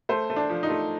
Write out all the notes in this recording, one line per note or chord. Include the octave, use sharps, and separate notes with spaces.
A3 C5
A3
D4
F3
D#4
A3